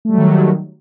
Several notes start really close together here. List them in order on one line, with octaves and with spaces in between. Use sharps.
A3 G3 F#3 D#3